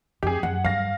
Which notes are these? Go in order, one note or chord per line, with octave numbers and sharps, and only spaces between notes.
F2 G4 G#4
F#2 F#5
G2 F5 A#6